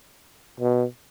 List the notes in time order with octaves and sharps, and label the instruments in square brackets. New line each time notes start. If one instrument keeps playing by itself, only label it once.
[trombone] B2